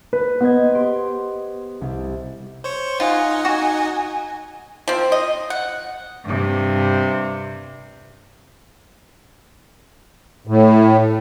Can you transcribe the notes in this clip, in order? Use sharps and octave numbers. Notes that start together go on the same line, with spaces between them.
B4
B3 C5 D#5 G#6
G4 C6 D7
C2
C5 C#5 C#6
D#4 F4 D#5 F#5 G#5
F#4
F3 C4
D#5
F#5
G2 C3
A2